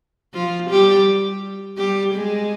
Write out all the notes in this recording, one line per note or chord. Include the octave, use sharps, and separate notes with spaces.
F3 F4
G3 G4
G3 G4
G#3 G#4